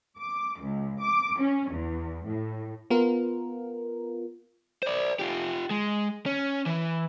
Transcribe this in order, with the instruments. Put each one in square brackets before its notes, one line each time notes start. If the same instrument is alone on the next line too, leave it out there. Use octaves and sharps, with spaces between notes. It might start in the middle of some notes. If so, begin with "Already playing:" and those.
[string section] D6
C#2
D6
C#4
E2
A2
[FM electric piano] B3 F4 A#4
[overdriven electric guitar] C5 D5
F4 G4
G#3
C#4
E3